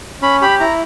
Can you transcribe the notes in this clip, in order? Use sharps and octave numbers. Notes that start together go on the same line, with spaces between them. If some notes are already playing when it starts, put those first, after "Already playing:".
C#4 B5
G4 B5
E4 A#5